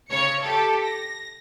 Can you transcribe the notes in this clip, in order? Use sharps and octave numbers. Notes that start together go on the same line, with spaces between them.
C#3 C#5 C#7
G4 A4
A#6